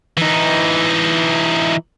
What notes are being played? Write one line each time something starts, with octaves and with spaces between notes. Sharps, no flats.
E3 D#4